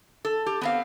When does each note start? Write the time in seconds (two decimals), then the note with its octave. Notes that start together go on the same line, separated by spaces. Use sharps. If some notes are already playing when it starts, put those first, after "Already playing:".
0.25 A4
0.46 G4
0.61 B3 C4 F5